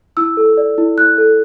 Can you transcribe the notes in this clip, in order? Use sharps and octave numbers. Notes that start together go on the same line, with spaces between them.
E4 E6
A4
D5
E4
E4 F#6
A4